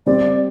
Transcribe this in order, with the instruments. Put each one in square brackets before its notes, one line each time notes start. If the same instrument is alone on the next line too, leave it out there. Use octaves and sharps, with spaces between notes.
[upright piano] G3 C4 G4 [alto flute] D5